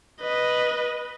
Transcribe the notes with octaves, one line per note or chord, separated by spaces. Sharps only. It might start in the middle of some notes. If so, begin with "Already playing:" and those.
B4 D#5